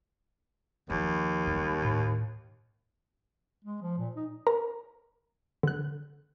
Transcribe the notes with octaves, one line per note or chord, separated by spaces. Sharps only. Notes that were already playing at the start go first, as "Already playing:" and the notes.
D#2 F3
C#3 G3
A2
G#3
F3
A#2
D#4
A#4 A#5
D3 F#6